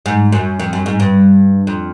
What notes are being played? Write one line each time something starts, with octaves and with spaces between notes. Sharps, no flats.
G#2
F#2
F2
F#2
G#2
G2
F2